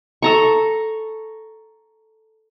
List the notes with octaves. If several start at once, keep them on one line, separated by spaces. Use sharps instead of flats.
A4 A#5 C#6